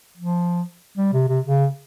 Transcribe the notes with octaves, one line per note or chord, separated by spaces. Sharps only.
F3
G3
C3
C3
C#3